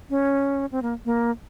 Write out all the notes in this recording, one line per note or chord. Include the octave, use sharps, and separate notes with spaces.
C#4
C4
A#3
A#3